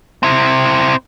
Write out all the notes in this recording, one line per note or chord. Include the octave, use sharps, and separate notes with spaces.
C4 E4